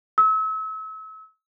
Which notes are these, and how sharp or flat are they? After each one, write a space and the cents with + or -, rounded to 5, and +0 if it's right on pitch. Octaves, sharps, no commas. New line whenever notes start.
E6 -35